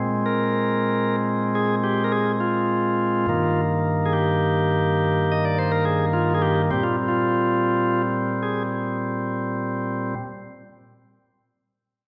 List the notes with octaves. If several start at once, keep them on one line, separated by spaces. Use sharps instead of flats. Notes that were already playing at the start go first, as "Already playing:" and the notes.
Already playing: A#2 G#3 C4
A#4
G#4
G4
A#4
G#4
F4
G2 D#3 A#3
G#4
G4
D#5
D5
C5
A#4
G#4
F4
G#4
G4
A#2 G3 C4 G4
F4
F4
G#4